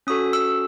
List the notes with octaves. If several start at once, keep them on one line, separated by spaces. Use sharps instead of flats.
C#4 F#4 A4 D#6
E6